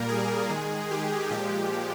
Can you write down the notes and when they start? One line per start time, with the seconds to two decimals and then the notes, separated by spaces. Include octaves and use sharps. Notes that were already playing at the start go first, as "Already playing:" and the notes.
Already playing: A#2 G3 A#3 A#4
0.09 G#4
0.50 D#3 G#3
0.91 G4
1.30 A#2 F3 G#3 G4